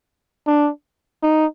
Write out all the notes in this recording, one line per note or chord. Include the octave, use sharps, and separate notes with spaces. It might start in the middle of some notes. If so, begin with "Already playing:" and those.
D4
D#4